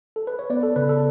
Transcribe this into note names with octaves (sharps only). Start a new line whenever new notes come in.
A4
B4
C#5
B3 B4 D5
A4
C#3 B4
A4